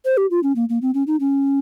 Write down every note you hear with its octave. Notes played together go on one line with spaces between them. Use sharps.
C5
G4
F4
C#4
A#3
A#3
C4
C#4
D#4
C#4